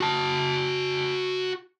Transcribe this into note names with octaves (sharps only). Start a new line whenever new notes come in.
F#4 A5